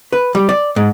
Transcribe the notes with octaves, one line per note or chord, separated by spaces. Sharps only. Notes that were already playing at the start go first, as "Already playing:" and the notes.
B4
G3
D5
G#2